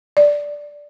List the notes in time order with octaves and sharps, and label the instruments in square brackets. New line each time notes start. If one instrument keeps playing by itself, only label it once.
[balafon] D5